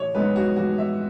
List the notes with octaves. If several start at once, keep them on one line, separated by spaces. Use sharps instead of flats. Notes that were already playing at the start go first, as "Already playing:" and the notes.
Already playing: A1 C#5
G#2 G#3 B3 B4
F#4
A1 F#4
E5